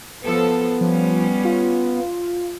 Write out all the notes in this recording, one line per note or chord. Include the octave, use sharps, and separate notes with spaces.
F3 B3 A4
F3 G3 C#4
F4